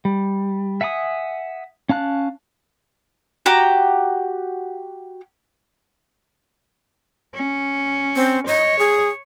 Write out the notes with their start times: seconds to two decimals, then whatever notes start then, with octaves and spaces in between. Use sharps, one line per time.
0.05 G3
0.81 E5 F#5 G#5 A5 D#6
1.89 C#4 F5 A5 F#6
3.46 F#4 G4 A#5
7.34 C#4
8.16 C4
8.47 C#5 D#5
8.79 G#4